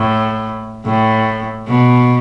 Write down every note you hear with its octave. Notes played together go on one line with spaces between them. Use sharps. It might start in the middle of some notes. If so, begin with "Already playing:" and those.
Already playing: A2
A2
B2